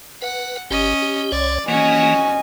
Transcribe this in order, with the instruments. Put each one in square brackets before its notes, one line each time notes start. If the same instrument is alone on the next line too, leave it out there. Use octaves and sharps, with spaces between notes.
[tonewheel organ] B4 [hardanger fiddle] F#5
[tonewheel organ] G1 G4 [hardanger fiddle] C#4 D#5
[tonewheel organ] G4
[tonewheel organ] C2 C#5 [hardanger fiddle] D5
[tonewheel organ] E3 A#3 [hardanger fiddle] C#4 F#4 [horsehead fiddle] D#5 G#5